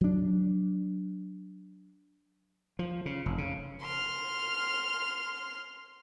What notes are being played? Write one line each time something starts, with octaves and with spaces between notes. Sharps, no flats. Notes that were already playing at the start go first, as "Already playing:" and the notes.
F#3 D4
F3
C#3
F1
C#3
C6 F6